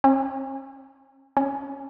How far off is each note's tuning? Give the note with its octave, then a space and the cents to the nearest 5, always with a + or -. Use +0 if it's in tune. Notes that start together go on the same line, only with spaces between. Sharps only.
C#4 -45
C#4 -5